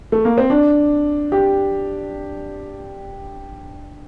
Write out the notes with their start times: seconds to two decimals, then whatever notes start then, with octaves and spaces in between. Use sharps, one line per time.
0.12 A3
0.25 A#3
0.38 C4
0.50 D4
1.32 G4